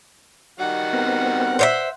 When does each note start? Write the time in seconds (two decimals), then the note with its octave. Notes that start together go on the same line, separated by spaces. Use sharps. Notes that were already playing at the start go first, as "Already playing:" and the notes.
0.59 D#3 G3 F#4 F#5
0.93 B3 C4 A#4
1.59 C5 C#5 E5